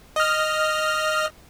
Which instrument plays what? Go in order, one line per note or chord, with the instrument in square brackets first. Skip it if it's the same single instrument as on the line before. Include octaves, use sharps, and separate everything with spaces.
[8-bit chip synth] D#5 F6